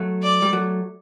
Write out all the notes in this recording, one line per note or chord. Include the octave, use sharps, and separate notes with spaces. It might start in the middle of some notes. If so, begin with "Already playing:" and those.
Already playing: F#3 A3
D5
G3
F#3 A3